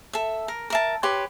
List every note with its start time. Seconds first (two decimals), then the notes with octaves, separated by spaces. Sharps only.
0.13 A4 E5
0.48 A#4
0.70 A#4 E5 A5
1.03 G4 B4 C#5 C6